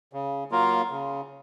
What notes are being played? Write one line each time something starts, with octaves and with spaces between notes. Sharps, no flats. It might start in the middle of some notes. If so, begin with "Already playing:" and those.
C#3
F#3 A#3 F4 A#4
C#3